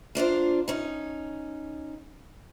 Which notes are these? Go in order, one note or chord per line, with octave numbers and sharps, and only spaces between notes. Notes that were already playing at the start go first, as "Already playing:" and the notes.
A#3 D4 F4 C5
C#4 D#4